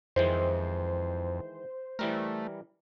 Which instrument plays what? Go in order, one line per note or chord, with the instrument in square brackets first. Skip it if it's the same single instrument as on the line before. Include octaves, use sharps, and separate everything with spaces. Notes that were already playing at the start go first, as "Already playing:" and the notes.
[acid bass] F2 [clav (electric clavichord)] D#3 E3 G#3 [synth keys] C5
[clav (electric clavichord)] E3 G3 A#4 [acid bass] A3